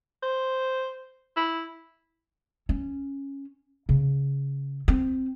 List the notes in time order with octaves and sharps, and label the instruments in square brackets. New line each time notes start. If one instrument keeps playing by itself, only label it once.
[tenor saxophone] C5
E4
[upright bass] C#4
C#3
C4